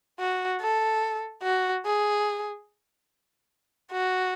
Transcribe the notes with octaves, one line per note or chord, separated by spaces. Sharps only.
F#4
A4
F#4
G#4
F#4